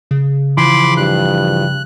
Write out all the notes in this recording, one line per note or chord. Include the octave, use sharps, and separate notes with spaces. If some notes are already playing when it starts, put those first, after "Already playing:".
C#3
E3 F3 B5 C6 D6
G2 F#6